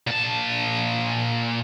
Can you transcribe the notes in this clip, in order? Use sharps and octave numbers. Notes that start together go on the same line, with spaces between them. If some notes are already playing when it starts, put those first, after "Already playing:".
A#2 A5